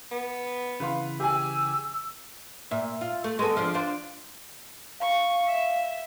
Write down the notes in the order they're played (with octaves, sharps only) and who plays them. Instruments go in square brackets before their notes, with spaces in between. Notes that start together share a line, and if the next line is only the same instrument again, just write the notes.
[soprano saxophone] B3
[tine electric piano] C#3 E3 [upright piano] B4 F5 C6
[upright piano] G4 G#5 [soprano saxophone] G#4 [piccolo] E6
[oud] A#2 E5
F4
A3
G#3 B3 A4
F3 C4 D4
D4 F4 C5
[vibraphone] F5 [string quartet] C#6
[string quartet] E5